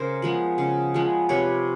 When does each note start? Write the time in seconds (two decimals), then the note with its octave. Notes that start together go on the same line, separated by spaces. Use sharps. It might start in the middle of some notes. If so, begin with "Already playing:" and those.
Already playing: C#3 A#4 C5
0.22 F3 G#3 B3
0.58 C#3
0.94 F3 G#3 B3
1.29 C3 B4 C#5